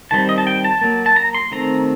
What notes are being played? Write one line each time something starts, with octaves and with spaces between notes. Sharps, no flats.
D#3 G3 C4 A5
D#5
A5
G5
A5
F#3 A#3
A5
A#5
C6
D#3 A3 C4 A#5